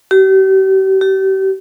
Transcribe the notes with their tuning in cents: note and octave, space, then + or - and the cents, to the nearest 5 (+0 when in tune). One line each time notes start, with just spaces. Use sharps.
G4 -40
G4 -35